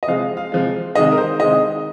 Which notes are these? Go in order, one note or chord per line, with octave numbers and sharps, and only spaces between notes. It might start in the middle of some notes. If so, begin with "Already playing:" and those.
D#5
C3 F3 G#3 F5
F5
C3 F3 G#3
C3 D#3 G#3 D#5
A#4
C5
C3 D#3 G#3 D#5